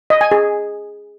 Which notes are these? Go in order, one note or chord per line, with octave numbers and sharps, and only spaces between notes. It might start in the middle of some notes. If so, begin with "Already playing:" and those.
D#5
G#5
G#4